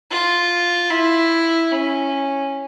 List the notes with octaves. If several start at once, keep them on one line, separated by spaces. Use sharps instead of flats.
F4
E4
C#4